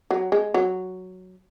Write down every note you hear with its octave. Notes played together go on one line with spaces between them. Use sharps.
F#3
G#3
F#3